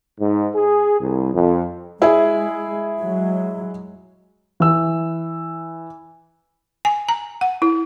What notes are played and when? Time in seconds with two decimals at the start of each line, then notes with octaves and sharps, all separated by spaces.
0.20 G#2
0.55 G#4
1.00 C2
1.34 F2
2.02 G#3 E4 G#4
3.00 F#3 G#3
4.60 E3 E6
6.85 G#5
7.09 A#5
7.41 F#5
7.62 E4